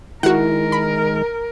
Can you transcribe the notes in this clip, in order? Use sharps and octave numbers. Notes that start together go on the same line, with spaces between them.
D#3 G#3 E4 F#4 A#4 F#5
B5